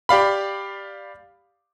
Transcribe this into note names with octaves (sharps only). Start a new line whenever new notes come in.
G4 D5 F5 B5